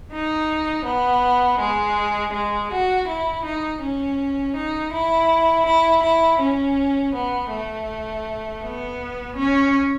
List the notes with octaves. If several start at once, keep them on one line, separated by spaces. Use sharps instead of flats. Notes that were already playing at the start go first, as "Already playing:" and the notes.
D#4
B3
G#3
G#3
F#4
E4
D#4
C#4
D#4
E4
E4
E4
C#4
B3
A3
B3
C#4